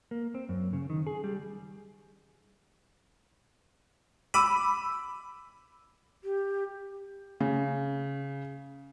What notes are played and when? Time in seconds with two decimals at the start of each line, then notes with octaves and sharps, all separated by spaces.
0.11 A#3
0.35 C4
0.49 F#2
0.73 C#3
0.90 D#3
1.07 G#4
1.24 G3
4.34 B5 D6 E6 D#7
6.24 G4
7.40 C#3